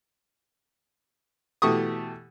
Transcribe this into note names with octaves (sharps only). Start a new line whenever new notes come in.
B2 E3 A3 G4 C#6 D#6